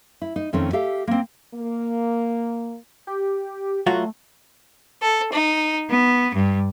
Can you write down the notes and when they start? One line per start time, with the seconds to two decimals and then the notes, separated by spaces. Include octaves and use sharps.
0.22 E4
0.36 D#4
0.53 F2 D#3 A3 C4 C#4
0.73 G4 A4 E5 F5
1.07 A#3 C4
1.54 A#3
3.07 G4
3.86 F#3 A3 F4 F#4
5.02 A4
5.32 D#4
5.90 B3
6.35 G2